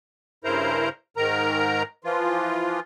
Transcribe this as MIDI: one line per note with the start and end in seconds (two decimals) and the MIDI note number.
0.44 0.89 43
0.44 0.89 49
0.44 0.89 64
0.44 0.89 70
0.44 0.89 72
0.44 0.89 82
1.17 1.83 44
1.17 1.83 51
1.17 1.83 70
1.17 1.83 82
2.04 2.80 52
2.04 2.80 53
2.04 2.80 65